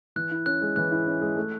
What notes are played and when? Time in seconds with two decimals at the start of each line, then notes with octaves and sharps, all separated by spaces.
0.16 E3 F#6
0.31 E4
0.46 C#4 F#6
0.62 G#3
0.76 E3 F#6
0.91 E4
1.07 C#4
1.22 G#3
1.36 A3